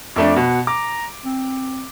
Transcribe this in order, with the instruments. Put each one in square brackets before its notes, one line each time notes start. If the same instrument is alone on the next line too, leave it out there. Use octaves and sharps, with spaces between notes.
[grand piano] F2 A3 D4 [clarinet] D6
[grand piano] B2 [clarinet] F#5
[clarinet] A#5 [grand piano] D6
[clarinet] C4